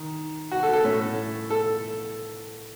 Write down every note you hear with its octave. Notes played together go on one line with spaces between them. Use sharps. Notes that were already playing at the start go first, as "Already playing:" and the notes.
Already playing: D#3
F#4
A4
A4
A2 A3 C#4
A4